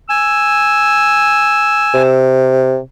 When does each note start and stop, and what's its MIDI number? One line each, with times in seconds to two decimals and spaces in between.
0.10 2.03 80
0.10 2.22 88
1.94 2.78 48